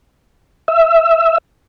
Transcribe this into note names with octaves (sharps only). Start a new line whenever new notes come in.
E5